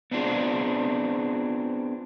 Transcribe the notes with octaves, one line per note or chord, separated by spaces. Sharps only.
B3 C4 D4 F4 G#4